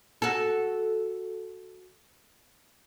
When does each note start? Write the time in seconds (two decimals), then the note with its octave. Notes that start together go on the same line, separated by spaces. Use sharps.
0.22 F#4 A4